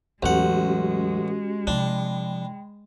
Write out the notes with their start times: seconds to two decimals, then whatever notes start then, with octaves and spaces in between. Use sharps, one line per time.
0.23 A1 E2 F#3 G#3 C#4 F#4 G4 F#5
1.67 C3 F3 D4 G5 B5